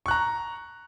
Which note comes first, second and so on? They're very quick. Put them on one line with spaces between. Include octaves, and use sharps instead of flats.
C#6 F#6 A#5